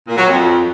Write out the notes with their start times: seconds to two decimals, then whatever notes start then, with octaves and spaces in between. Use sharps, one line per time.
0.08 A#2
0.17 F#3
0.26 F2